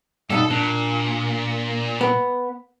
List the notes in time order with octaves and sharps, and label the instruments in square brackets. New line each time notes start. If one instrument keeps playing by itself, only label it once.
[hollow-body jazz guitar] G2 B2 D#4 [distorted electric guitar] A4
[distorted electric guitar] A#2 [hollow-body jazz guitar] D4
[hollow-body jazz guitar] B3